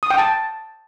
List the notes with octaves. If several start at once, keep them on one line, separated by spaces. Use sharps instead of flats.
D#6
G5
A5